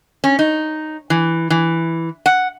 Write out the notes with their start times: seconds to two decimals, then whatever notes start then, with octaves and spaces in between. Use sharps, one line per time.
0.24 C#4
0.39 D#4
1.10 E3
1.50 E3
2.26 F#5